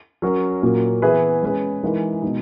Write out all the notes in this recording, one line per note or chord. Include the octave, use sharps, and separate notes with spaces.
F#3 C#4 F#4 A#4
A#2 F#3 A#3
E3 B3 E4 G#4 B4
G#3 C#4 G#4 B4
E3 G#3 D#4 A#4
B2 G#3 D#4